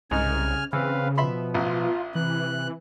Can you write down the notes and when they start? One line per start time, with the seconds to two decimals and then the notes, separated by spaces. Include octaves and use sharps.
0.11 C2 G#2 C#3 D#4 G#5 F6
0.73 C#3 E3 C4 B4 F5
1.18 B2 F3 B3 E5 B5 C6
1.54 A1 F4
2.15 C3 E3 F#6